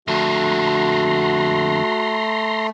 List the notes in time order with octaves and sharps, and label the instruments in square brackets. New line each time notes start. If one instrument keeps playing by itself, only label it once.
[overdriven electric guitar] F2 D3 [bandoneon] A3 [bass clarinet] F#4 [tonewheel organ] A#5 C6